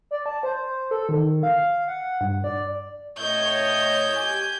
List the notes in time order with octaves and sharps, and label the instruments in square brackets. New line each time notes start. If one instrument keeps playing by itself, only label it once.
[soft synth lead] D5
A5
C5
A4
D#3
F5
F#5
G2
D5
[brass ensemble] A2 C#5 D#5 [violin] G6
[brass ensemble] G4 G#5